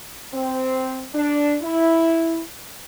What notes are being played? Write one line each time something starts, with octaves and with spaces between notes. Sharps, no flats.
C4
D4
E4